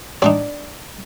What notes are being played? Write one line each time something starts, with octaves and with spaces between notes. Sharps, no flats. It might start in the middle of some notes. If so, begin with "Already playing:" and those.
C4 D4 D#4 D5